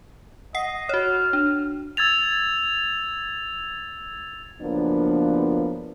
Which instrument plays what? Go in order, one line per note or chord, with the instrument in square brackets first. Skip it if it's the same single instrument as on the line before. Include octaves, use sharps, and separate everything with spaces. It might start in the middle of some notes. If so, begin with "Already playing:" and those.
[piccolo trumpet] D#5 [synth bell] F#5 C7
[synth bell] F#4 C#5 [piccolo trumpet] F6
[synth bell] D4
[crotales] E6 G#6 A6 F7
[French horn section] F#2 C#3 F3 A#3 B3 D4